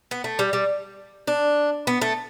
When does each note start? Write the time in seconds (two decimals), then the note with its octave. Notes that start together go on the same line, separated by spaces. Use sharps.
0.11 B3
0.24 A3
0.39 G3
0.53 G3
1.27 D4
1.87 B3
2.01 A3